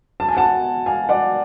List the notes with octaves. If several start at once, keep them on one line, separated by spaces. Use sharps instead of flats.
A5
G#5
F#5 A5
F5 G#5
D5 F#5